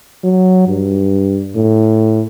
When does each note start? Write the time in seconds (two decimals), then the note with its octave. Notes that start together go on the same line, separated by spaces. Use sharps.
0.24 F#3
0.68 G2
1.56 A2